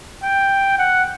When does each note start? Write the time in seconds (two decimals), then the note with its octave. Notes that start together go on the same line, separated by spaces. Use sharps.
0.23 G5
0.78 F#5